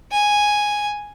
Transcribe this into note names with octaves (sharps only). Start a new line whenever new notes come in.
G#5